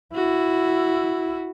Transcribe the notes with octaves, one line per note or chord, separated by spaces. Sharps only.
E4 F#4